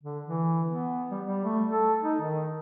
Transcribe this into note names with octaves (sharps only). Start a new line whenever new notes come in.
D3
E3
B3
G3
G3
A3
A4
D#4
D#3